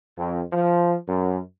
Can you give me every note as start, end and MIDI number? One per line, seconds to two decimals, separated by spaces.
0.18 0.41 41
0.53 0.95 53
1.07 1.38 42